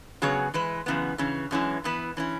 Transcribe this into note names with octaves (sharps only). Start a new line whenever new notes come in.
C#3 F#3 B3 G#4 C#5
E3 G#3 E4 B4
F#2 C#3 E3 B3
C#3 E3 C#4
F#2 E3 G#3 C#4 E4
E3 B3 E4 B4
E3 C#4 E4